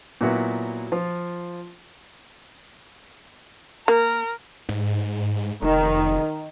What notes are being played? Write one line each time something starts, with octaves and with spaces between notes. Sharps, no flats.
A#2 F#3 B3 E4 F#4
F3 F4
A#3 A#4
G#2
F1 D#3